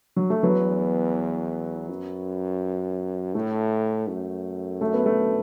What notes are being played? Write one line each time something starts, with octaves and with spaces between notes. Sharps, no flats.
F#3
A3
E2 F#3 B3
F#2
A2 A3
F#2
A3
B3
A3